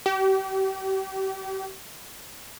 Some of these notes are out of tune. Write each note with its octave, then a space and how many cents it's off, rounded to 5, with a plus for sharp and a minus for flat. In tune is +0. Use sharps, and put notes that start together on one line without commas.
G4 -35